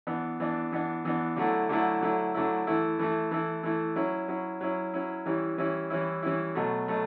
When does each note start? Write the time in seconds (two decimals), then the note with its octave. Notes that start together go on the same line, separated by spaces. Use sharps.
0.07 E3 B3 D4
0.40 E3 B3 D4
0.72 E3 B3 D4
1.05 E3 B3 D4
1.36 D3 F#3 A3 E4
1.69 D3 F#3 A3 E4
2.01 D3 F#3 A3 E4
2.34 D3 F#3 A3 E4
2.67 E3 A3 E4
2.99 E3 A3 E4
3.31 E3 A3 E4
3.63 E3 A3 E4
3.96 F#3 C#4 E4
4.28 F#3 C#4 E4
4.61 F#3 C#4 E4
4.93 F#3 C#4 E4
5.26 E3 G3 C#4 E4
5.58 E3 G3 C#4 E4
5.90 E3 G3 C#4 E4
6.22 E3 G3 C#4 E4
6.55 B2 F#3 A3
6.88 B2 F#3 A3